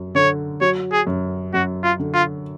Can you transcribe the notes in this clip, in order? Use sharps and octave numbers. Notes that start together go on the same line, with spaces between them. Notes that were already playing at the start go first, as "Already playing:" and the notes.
Already playing: F#2
D3 C#5
F#3 C#5
G#4
F#2
F#2 F#4
F4
D3
F4